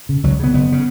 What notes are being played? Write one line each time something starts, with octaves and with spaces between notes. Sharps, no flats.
C#3
C#2 F#3
C#3 B3
F#1 B3
C#3